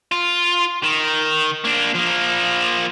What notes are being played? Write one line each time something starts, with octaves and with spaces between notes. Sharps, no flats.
F4
D#3
A#3 D4
F3 A#3